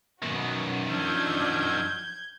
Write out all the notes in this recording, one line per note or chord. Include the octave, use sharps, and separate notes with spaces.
F#2 B2 D#3 F#4
F3 D4 E6 F6 G6 G#6